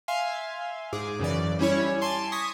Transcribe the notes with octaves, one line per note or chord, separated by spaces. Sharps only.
E5 F5 G#5 C6
G#2 G#4 D6
F#2 C#3 E3 D5
G3 C#4 E4 C#5
G#5 A5 C6 D6
C#6 D#6 G#6 A#6 B6